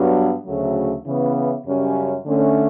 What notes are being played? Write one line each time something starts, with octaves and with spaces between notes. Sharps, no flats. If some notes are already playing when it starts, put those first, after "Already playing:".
Already playing: G2 F#3 B3
D2 C#3 F#3 A3
C#3 E3 B3
F#2 C#3 G3 C#4
D3 A3 C#4